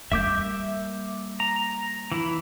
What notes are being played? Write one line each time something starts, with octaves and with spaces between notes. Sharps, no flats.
G3 A#3 E5 D6 G6
A#5
E3 E4